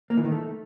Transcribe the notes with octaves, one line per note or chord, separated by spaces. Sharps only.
A#3
E3
D#3
A3